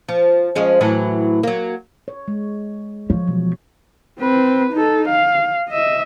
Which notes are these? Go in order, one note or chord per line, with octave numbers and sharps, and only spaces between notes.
F3
F3 G#3 C#4
A2 E3 F#3
F#3 A#3
C#5
G#3
F3 C#5
B2 E3 F#3
C4 B4
D#4 A4
F5
D#5 E5